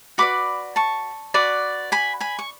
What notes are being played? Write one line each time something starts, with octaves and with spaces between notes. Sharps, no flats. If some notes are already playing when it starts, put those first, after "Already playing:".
F#4 B4 D5 B5 D6
A5 C#6
F#4 B4 D5
G#5 B5
G#5 B5
C#6